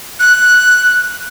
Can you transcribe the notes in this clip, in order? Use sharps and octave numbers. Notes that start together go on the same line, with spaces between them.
F#6